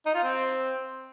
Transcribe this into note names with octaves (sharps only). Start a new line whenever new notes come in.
D#4
F4
C4